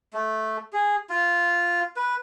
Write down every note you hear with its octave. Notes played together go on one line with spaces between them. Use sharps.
A3
G#4
F4
B4